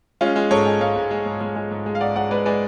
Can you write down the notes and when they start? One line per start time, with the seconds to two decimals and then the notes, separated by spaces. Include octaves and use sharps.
0.21 G#3 C#4 F4
0.36 G#3
0.51 G#2 A4 C#5
0.66 G#3
0.81 G#2 C#5 F5
0.96 G#2
1.11 G#3
1.26 G#2
1.41 G#3
1.56 G#3
1.71 G#2
1.86 G#3
1.95 F5
2.00 G#2 D5 F#5
2.15 G#2 D5 F#5
2.31 G#3 B4 D5
2.45 G#3 B4 D5